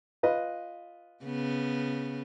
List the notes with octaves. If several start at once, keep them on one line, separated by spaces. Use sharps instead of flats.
F4 B4 D#5
C#3 B3